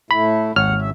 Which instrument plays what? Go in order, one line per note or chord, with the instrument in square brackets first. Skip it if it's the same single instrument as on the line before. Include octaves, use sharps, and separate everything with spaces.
[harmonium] A2 A3 E4 [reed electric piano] B5
[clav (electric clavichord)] G#1 C#5 [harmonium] D#2 F#5 [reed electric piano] F6
[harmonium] C#3 E5